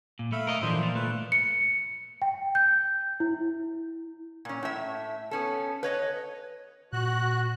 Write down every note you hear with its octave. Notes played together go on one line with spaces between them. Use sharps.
A#2
A3 E5 F5 B5
A#4 D#5
A#2 D3 E3 F3 C5
F4
A3 B4
C#7
G5
G6
E4
A#2 C#4
A2 E5
B3 C#4 A4
B4 C#5 D#5
A#2 F#4 F#6